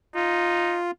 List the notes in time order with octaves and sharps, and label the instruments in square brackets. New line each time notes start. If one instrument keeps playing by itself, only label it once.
[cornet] D#4 [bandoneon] F4